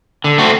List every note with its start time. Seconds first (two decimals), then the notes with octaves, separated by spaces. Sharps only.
0.24 D3
0.38 A3 C4 F#4